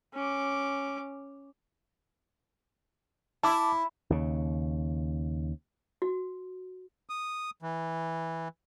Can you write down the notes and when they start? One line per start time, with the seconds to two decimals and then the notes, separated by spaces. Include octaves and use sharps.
0.14 C#4 D6
3.43 E4 A5 D6
4.10 D#2 C#3
6.02 F#4
7.09 D#6
7.62 E3